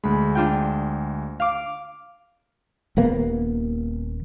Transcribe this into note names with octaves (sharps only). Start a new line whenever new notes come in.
D2 G#3 B5
D4 F4 G5
F5 D6
D#1 D#2 A#3 B3